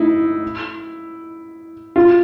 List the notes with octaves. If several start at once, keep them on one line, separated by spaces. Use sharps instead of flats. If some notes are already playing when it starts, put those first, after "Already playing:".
Already playing: D#4 E4
F4